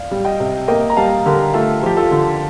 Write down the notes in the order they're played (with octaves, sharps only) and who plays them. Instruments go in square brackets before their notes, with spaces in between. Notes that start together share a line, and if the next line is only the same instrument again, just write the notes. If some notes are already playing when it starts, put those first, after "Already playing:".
Already playing: [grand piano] D5 F5
[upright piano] G3
[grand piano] D#5 G5
[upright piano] C3
[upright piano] A#3 [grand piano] D#5 G5
[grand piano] A#5
[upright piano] G3 [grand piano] F5 A5
[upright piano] D3 [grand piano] G4 A#4
[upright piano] A3 [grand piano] F4 A4
[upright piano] F3 [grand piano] G4
[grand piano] F4 A4
[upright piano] D3